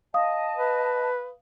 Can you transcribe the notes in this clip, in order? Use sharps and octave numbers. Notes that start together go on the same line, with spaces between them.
D#5 F5 A5 D#6
B4